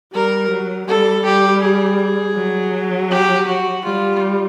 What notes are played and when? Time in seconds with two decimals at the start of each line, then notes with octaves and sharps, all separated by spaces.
0.13 G3 A#4
0.51 F#3
0.88 G3 A4
1.25 G3 G4
1.62 G#4
2.36 F#3
3.11 G4
3.47 F#4
3.84 G3 F4